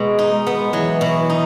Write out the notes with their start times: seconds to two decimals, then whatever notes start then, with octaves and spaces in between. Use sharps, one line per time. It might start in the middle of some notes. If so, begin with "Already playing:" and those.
Already playing: B2 G#3
0.19 D#4
0.32 G#3
0.47 B3
0.73 E3 F#3
1.01 B2
1.30 D#4